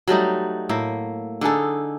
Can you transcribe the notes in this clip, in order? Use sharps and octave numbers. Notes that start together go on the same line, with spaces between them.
F#3 G3 A3 D#4
A2 A#3 E5
D3 D#4 G#4 A4